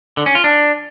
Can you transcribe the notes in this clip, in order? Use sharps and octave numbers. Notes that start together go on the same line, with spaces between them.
D3
C#4
F4
D4